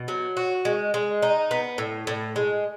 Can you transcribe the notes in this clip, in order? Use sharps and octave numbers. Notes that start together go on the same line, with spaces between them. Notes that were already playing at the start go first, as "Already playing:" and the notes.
Already playing: B2
F#3
F#4
G#3
G#3
D#4
B3
A2
A2
G#3